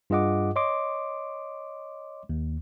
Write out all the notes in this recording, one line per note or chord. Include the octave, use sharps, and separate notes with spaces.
G2 F4 G#4 D#5 F#5 D6
C#5 D#5 C6 D6
D#2